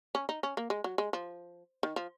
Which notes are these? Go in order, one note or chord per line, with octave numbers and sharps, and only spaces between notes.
C#4
D#4
C#4
A#3
G#3
F#3
G#3
F3
D#3
F3